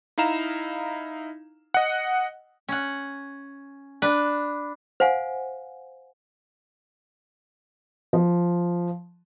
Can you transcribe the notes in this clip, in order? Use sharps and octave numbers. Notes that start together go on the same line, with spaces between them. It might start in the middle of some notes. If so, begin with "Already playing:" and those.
D#4 E4 F5 A#5 E7
D#5 F#5
C#4 F#5
D4 B4
C5 F5 F#5 G#5
F3